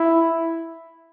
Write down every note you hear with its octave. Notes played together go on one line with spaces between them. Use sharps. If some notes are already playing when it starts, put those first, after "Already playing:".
Already playing: E4